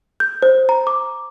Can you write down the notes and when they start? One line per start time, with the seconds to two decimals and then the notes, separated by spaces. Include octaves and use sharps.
0.20 G6
0.42 C5
0.69 A#5
0.87 D6